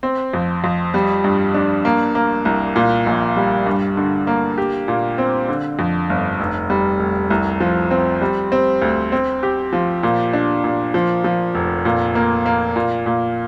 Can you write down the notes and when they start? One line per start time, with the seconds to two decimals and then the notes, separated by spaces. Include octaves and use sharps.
0.03 C4
0.33 F2
0.64 F2
0.94 G3
1.24 G2
1.54 D4
1.85 A#3
2.15 A#3
2.45 C2
2.76 A#2
3.07 A#1
3.36 G3
3.66 G2
3.97 D3
4.27 A#3
4.58 G4
4.88 A#2
5.18 C4
5.48 D3
5.79 F2
6.10 G1
6.40 F1
6.70 G3
7.00 F1
7.30 C2
7.60 F3
7.91 C4
8.21 G3
8.52 C4
8.82 D2
9.12 C4
9.43 G4
9.73 F3
10.03 A#2
10.33 D4
10.64 A#2
10.94 F3
11.24 F3
11.55 F1
11.85 A#2
12.15 A#3
12.46 A#3
12.76 A#2
13.06 A#2